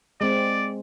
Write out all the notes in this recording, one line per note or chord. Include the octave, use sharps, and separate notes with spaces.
G#3 C4 D5